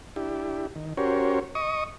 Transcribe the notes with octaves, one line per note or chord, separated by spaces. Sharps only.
D4 E4 G4
D#3
C#4 F#4 G4 A#4 C5 C#5
D#5 C#6 D#6